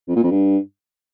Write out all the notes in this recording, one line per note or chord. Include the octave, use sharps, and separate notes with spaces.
F2
A#2
F2
G2